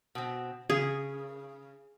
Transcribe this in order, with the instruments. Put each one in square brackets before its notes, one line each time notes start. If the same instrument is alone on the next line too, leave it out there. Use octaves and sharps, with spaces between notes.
[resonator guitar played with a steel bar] B2 C4
[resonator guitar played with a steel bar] C#3 [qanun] G#4